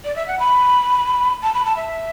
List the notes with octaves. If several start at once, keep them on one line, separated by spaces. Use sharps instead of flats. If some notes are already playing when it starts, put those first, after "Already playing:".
D5
E5
F#5
B5
A5
B5
A5
E5